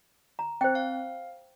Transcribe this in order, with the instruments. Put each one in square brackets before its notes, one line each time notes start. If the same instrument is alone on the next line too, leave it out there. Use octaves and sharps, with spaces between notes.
[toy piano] A#5
[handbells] C4 [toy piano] C5 G5
[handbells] F5